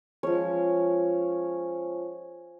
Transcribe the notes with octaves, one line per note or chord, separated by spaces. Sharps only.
F3 G#3 C#4 C#5